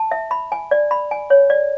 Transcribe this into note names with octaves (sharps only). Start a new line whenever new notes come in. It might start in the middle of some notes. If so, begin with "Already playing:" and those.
Already playing: A5
E5
B5
G#5
D5
B5
G#5
C#5
D5